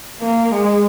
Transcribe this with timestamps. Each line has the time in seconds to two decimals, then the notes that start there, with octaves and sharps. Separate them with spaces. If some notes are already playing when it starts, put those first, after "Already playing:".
0.20 A#3
0.51 G#3